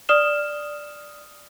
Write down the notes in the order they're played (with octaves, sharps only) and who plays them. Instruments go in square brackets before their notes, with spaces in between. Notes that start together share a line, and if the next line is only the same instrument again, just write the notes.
[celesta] D5 D#6 F6 E7 G7